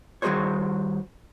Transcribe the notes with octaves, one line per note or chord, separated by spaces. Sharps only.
D#3 G3 F#4 G#4 C5 C#5